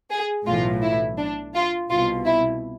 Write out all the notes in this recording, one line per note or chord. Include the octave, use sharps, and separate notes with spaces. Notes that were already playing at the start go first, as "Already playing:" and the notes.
G#4
B1 A2 E3 F4
E4
D4
F4
C2 B2 F4
E4